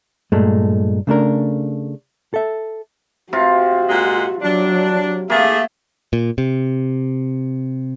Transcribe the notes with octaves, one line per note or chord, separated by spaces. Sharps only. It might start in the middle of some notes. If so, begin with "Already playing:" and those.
G2 A#2 G#3 A3
C#3 A3 D4 A#4
A4 E5
C3 F4 F#4
A#2 G#3 F#5
F#3 D4
A3 A#3 G#4 E5
A#2
C3